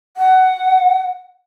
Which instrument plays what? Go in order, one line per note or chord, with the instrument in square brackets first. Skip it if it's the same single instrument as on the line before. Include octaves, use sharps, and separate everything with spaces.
[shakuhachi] F#5